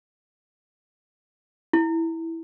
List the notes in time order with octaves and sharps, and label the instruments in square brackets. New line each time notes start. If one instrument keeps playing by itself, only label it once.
[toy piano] E4